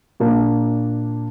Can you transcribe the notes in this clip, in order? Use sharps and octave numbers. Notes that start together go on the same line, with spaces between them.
A#2 A#3 D4